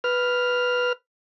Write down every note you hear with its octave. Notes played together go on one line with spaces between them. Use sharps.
B4 F6